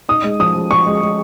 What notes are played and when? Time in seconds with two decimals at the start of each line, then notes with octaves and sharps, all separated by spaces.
0.09 D#4 D#6
0.24 G#3
0.40 F3 D#6
0.55 F3
0.71 F3 C#6
0.86 G#3
1.01 G#3